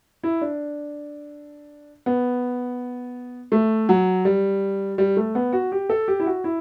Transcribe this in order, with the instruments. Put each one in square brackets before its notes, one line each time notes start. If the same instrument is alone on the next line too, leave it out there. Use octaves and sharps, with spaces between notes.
[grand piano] E4
D4
B3
A3
F#3
G3
G3
A3
B3
F#4
G4
A4
G4
E4
F#4
E4